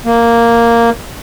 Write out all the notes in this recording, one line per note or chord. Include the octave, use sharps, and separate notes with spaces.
A#3